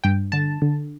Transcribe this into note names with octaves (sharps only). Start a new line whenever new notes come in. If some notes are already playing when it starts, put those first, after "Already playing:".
G2 G5
D3 A5
D3